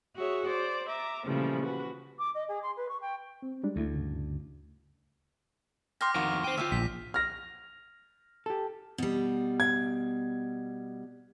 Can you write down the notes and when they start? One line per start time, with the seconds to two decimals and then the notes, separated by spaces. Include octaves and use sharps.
0.16 F#4 G#4 C#5 E5
0.46 C5 D5
0.87 E5 A#5 D6
1.24 A#2 C#3 E3 F3 G3 A3
1.63 F#4 B4
2.18 D6
2.34 D#5
2.48 G#4
2.62 C6
2.76 B4
2.89 C#6
3.01 G5
3.42 C4
3.63 G3 G#3 D4
3.76 D2 A3 E4
3.95 G2 C#3
6.01 G5 C6 D6 F6 A#6
6.15 F2 D#3 F4 F#4 A#4
6.44 C5 G5 D#7
6.58 D2 F4 E5 G5
6.72 A#1 B6
7.14 F6 A#6
8.46 G4 A4
8.98 B2 G3
9.60 G#6